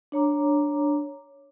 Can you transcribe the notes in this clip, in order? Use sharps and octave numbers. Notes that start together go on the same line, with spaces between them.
D4 C#5 A#5 D6